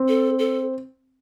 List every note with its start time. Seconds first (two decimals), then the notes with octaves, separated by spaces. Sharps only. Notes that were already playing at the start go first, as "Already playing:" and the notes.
Already playing: C4
0.08 A4
0.39 A4